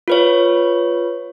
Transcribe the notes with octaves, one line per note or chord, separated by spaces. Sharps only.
F4 B4 C#5